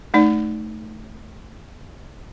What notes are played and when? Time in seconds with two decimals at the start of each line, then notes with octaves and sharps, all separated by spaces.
0.14 A3 D#4 D5